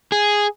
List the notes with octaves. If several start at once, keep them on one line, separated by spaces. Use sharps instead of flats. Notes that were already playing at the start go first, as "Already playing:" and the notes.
G#4